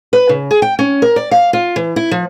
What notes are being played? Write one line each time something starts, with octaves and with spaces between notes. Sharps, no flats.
B4
C#3
G#4
G5
C#4
A#4
D5
F5
F4
E3
E4
F3